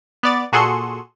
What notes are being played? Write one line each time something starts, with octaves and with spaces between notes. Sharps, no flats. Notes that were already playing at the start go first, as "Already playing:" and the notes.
B3 D5 A6
A#2 F#4 G#4 A4 C6 C#7